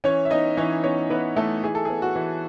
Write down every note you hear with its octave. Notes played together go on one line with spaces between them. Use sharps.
E3 C#4 C#5
E5
B3 D#4 D#5
E3 C#4 C#5
B3 C#4 C#5
E3 B3 B4
E3 A3 A4
E3 G#4
A4
B3 G#4
F#4
E3